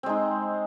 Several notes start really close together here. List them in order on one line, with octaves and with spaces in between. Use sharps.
C4 G#3 D#4